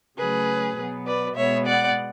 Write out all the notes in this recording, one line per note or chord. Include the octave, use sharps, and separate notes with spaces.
C#3 F#3 A3 G#4 B4
B2 F#3 B3
B4 D5
B2 G#3 B3 C#5 E5
D5 F#5